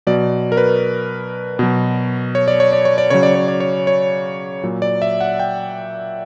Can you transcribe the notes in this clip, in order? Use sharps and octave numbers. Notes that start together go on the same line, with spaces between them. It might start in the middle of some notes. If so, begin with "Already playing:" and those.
B2 F#3 D5
A#4
B4
B2 F#3
C#5
D5
C#5
D5
C#5
D5
C#3 F#3 C#5
D5
C#5
D5
C#5
C#5
A#2 F#3
D5
E5
F#5
G5